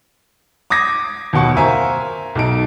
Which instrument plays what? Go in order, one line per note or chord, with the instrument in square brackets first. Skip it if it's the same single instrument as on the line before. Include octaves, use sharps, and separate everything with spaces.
[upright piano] D6 D#6 G#6 A#6
D#2 B2 F#5 C#6
A#4 C5 E5 F5 G#5 A#5
B1 D#4 D7